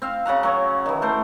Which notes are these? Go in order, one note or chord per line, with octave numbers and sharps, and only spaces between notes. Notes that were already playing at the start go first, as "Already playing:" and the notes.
C4 F5
C#3 F#4 F#5 A#5
F#3 C#5
D#3 E3
A3 A#4 C5